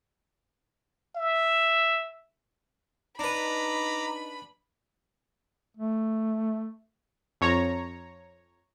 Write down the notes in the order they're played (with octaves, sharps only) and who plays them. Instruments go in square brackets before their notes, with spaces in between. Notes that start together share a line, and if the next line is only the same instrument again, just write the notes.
[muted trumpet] E5
[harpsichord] D4 B4 [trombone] D#4 [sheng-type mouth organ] A#5 D6 [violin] B5
[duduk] A3
[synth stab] F2 C#5 A#5